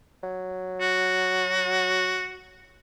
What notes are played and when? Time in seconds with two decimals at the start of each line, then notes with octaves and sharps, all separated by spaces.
0.23 F#3
0.80 F#4